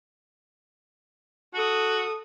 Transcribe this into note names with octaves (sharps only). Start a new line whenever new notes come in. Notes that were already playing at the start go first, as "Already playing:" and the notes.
F#4 A4 D#6